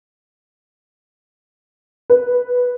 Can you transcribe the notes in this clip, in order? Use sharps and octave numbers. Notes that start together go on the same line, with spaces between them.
B4